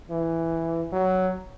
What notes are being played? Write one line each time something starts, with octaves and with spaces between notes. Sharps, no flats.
E3
F#3